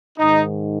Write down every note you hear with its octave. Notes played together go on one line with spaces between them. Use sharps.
G#2 D#3 D#4